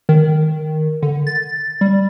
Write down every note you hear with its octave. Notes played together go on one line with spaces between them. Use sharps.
D#3
D3
A6
G3